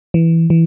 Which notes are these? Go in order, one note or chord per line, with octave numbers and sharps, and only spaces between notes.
E3
E3